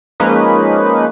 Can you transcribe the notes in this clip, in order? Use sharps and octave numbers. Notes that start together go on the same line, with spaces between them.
F3 G#3 A#3 C#4 D#4 B4